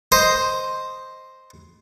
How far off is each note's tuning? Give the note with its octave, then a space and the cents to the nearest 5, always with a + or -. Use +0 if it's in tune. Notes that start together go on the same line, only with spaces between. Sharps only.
C5 +0 D#5 +0